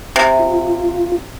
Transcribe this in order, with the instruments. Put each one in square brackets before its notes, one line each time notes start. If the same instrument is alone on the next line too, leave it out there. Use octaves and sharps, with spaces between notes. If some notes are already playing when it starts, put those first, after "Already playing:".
[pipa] C3
[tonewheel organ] F4